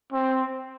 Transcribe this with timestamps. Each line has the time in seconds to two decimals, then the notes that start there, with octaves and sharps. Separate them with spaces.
0.13 C4